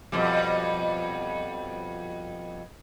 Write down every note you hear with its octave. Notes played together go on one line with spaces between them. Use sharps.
F2 B2 G3